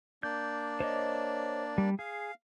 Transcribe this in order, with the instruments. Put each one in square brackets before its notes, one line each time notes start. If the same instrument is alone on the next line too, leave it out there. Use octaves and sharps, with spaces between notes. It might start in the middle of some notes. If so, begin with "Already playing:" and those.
[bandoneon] A#3 D4 D5 [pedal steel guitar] G6
[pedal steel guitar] C5 C#5 D#5
G3
[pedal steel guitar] G#4 [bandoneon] F5